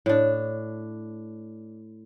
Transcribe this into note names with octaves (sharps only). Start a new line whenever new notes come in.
A2 D4